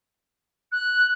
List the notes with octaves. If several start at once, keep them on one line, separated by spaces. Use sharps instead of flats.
F#6